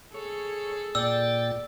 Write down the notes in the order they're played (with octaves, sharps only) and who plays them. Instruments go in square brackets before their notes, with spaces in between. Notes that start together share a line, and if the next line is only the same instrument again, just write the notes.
[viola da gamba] G#4 A4 [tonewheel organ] C#5
[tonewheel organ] A#2 G5 A6 [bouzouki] D5 [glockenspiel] E6